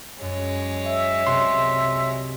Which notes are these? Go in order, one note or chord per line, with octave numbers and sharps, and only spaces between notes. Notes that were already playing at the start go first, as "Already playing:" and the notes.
F#2 G#3 C#5
E5
C2 C3 F#4 C6